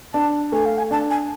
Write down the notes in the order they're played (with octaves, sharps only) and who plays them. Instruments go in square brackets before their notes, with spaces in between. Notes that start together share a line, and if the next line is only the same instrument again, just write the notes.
[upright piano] D4 [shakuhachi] A5
[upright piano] A3 [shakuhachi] G#5
[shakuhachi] F5
G#5
[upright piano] D4 [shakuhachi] A5
[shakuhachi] G#5